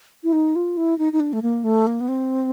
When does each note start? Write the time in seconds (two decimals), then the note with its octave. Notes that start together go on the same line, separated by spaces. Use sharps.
0.23 E4
0.33 D#4
0.56 F4
0.77 E4
0.99 D#4
1.13 D#4
1.20 D4
1.33 A3
1.42 A#3
1.64 A3
1.87 A#3
2.01 B3
2.08 C4